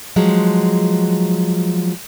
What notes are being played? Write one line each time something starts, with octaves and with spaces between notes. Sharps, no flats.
F3 F#3 G#3